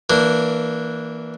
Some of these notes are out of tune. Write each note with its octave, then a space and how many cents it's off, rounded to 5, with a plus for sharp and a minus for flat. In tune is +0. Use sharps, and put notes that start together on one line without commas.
E3 -15 A#3 +0 D4 +0